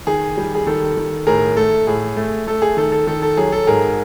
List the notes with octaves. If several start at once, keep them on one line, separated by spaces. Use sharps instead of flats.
D#3 G#4
G3
G#4
D#3 A4
D#3
A2 G#4 A#4
A3 A4
A2 G#4
A3
A3 A4
G#4
D#3 A4
A4
D#3 A4
A4
F#3 G#4
A4
G#2 G#4 A#4